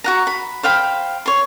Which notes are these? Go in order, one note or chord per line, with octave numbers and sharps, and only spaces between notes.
F#4 F#5 A#5
B5
C5 F5 G5 B5
C#5 C6